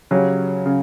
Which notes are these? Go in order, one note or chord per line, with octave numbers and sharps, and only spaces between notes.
C#3 F#3 C#4 G4
C#3